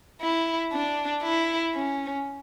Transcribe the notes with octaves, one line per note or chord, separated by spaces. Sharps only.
E4
D4
E4
C#4